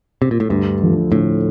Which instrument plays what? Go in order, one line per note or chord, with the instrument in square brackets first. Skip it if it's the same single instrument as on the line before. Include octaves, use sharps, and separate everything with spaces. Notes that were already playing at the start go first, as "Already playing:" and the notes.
[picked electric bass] C3
A#2
A2
[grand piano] D2 [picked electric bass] G2
[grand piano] D3 F3
[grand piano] D2 [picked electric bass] A2